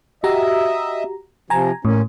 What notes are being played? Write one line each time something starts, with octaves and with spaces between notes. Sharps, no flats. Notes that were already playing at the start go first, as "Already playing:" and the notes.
F#4 G4 D#5 E5 A#5
C3 F3 G#5 A#5
A2 A#3 C#4